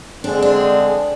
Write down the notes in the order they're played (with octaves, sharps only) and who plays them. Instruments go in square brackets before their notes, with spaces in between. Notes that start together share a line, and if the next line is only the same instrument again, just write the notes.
[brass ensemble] D3 G#3 C4 G#4 [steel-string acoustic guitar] D4
[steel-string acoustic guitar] D4